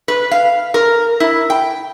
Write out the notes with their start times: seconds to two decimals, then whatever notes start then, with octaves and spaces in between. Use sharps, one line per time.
0.08 B4
0.31 F5
0.74 A#4
1.20 E4
1.50 G5